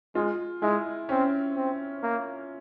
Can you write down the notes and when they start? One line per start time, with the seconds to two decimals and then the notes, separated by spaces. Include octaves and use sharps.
0.15 G#3 F4
0.62 G#3 E4
1.09 C4 C#4
1.57 C4
2.03 A#3